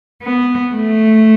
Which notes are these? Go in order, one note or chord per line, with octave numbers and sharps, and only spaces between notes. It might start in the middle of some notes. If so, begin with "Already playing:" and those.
B3
A3